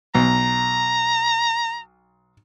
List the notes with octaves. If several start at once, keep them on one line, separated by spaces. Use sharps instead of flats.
B1 A#5